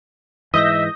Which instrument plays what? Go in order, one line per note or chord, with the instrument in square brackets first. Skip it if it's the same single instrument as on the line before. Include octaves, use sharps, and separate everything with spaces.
[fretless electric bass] G#2 E3 [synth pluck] D#5 G6 A#6 [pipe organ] E5 [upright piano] D#6